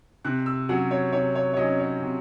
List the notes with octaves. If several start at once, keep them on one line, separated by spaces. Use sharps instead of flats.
C3 F#6
E6
F#3 C#4 F#5
C#5
C3 C#5
C#5
C#5
F#3 C#4 D#5
C#5
C3